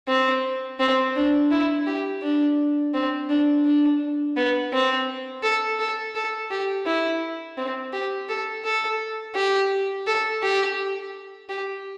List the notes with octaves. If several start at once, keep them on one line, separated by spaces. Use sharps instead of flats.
C4
C4
D4
E4
G4
D4
C4
D4
D4
B3
C4
A4
A4
A4
G4
E4
C4
G4
A4
A4
G4
A4
G4
G4